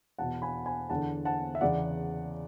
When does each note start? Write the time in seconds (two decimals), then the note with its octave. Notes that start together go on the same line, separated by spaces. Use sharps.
0.19 E2 B2 F#5 A5
0.42 G#5 B5
0.66 G#5 B5
0.90 E2 D3 F#5 A5
1.25 F#5 A5
1.55 E5
1.61 E2 C#3 E3 D5 F#5